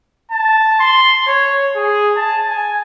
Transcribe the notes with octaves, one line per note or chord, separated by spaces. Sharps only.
A5
C6
C#5
G#4
A5
G#5